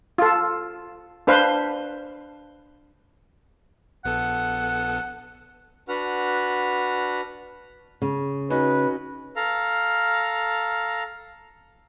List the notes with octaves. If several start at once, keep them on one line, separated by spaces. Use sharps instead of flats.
F4 A4
D4 B4 C5 F5
A#1 B3 A4 F#5
D4 F#4 B4 F#5 F6
C#3
C#4 D#4 F#4 B4
A4 F5 A#5